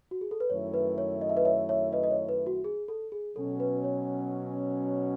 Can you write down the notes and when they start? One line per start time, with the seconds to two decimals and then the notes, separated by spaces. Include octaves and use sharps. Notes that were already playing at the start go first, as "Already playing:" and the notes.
0.11 F#4
0.21 G#4
0.31 A4
0.40 B4
0.49 F#2 D#3 A3 E4 C#5
0.74 B4
0.98 C#5
1.21 D#5
1.29 E5
1.37 B4 D#5
1.45 C#5 E5
1.69 C#5 E5
1.92 B4 D#5
2.03 D#5
2.11 C#5
2.29 B4
2.46 F#4
2.64 G#4
2.88 A4
3.12 G#4
3.36 B2 F#3 C#4 A4
3.60 B4
3.84 C#5